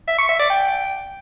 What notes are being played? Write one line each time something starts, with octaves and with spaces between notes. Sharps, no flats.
E5
C#6
E5
D5
G5